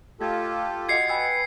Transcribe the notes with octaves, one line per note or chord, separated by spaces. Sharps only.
A3 F4 G4 A4 G#6
F#4 D#5 F#5 G#6 C7 C#7
B4 G5 G#5 E6